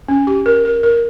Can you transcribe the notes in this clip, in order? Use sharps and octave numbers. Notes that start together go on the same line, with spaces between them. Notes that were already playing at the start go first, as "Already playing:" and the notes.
C#4
G4
A#4
A#4
A#4